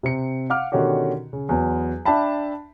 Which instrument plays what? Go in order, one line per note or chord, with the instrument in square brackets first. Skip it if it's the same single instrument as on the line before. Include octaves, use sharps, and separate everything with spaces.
[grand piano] C3 C4 C#7
F5 F#5 D6 F6
B2 D3 D#3 C#4 F#4 G4
C#3
E2 F#3 B3
D4 E5 G5 A5 B5